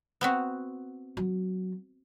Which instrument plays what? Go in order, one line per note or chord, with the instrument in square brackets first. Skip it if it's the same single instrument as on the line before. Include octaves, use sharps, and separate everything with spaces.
[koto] B3 C4 F#4
[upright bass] F#3